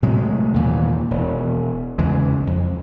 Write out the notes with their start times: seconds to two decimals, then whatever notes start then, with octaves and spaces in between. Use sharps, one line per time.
0.02 A2 C3 F#3 G#3
0.54 D#2 A#2 E3
1.11 E1
1.98 E2 C#3 E3 G#3
2.47 F2